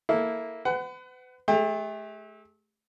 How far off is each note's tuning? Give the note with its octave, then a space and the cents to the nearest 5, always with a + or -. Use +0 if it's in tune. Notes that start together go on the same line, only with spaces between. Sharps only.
A#3 +0 E4 -10 A4 -10
B4 +40 F#5 +20
A3 -30 G4 +40